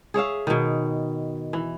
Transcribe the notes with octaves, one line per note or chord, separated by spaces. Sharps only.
G#4 C#5 E5 F5
B2 D#3
E3